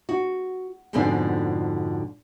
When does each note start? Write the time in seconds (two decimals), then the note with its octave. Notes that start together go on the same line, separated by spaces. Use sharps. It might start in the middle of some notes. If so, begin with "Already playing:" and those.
0.09 F#4
0.93 F2 G#2 B2 D3 D4 G#5